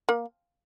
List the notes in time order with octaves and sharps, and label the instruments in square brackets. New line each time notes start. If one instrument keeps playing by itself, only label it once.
[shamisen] A#3